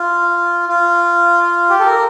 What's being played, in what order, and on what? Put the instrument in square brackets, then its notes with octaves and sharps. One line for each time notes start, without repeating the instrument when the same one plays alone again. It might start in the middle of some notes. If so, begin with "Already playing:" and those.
Already playing: [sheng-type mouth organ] F4
F4
G4
A4
A#4